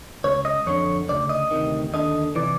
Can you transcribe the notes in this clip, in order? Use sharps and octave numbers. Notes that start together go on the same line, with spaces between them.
C#2 C#3 C#5
D#5
F2 D3 C#5
D2 C#3 D5
D#5
D2 C3 D#3
D#2 D3 D#5
C3 E3 D5